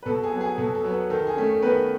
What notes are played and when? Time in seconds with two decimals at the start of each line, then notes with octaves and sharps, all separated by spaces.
0.03 B4
0.06 B2 A4
0.23 G#4
0.32 F#3 B3
0.41 G#4
0.58 B2 A4
0.75 A4
0.84 F#3 B3
1.10 D#3 A4
1.27 G#4
1.36 A3 C#4
1.62 D#3 B3 B4